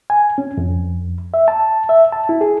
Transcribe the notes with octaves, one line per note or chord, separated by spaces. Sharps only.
G#5
C#4
F2
E5
A5
E5
A5
E4
G#4